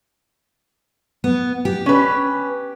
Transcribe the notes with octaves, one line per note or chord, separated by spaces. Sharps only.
B3
G4
C#4 B4